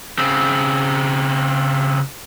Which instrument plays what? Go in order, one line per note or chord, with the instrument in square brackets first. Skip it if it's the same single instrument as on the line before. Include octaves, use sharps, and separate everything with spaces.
[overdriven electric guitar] C#3 C4